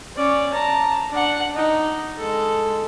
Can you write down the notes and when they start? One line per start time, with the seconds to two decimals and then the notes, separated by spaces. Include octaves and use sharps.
0.16 C#4 D5
0.52 A5 A#5
1.11 D4 F#5
1.55 D#4
2.18 G#3 A4